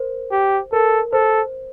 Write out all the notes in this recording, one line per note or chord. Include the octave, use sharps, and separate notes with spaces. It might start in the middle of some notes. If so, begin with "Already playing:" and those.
Already playing: A#4 C5
G4
A4 A#4
A4 C5